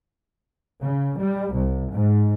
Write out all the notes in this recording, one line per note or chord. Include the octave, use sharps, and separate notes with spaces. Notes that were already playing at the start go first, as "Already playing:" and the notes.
C#3
G3
C2
G#2